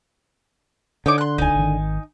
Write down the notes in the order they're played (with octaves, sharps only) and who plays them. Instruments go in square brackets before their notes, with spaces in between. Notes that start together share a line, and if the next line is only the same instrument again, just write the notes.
[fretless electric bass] D3 [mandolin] D#4 C#5 D6
[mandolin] C6 F#6
[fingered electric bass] D#1 C#2 [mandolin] D#4 G#5
[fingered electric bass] G#1 D#3